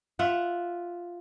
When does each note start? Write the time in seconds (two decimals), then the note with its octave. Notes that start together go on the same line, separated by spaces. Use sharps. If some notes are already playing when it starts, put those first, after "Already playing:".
0.19 F4 E5 F#5